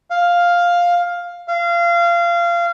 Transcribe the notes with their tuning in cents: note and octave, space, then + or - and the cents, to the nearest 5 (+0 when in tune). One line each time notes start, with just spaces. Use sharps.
F5 +5
F5 -25